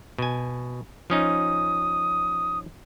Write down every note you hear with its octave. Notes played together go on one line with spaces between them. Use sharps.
B2 G#5
F3 C#4 D#4 D#6